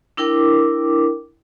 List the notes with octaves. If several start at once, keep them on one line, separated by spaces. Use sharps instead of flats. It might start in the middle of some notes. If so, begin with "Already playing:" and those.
D4 E4 A#4 G5 D6